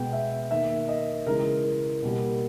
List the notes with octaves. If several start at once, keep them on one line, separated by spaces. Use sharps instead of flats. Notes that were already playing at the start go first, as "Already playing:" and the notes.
Already playing: B2 G#3 B3 G5
E5
D#3 A#3 E5
D#5
C#3 E3 G#3 A#4
B2 G3 A#3